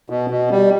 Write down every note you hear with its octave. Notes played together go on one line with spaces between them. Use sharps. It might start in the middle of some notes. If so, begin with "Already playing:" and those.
B2
B2
G3